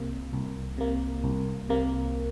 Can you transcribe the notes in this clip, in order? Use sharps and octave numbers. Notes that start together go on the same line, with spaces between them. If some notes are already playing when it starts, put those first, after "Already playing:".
Already playing: C2 C3 A#3
C2
C3 A#3
C2
C3 A#3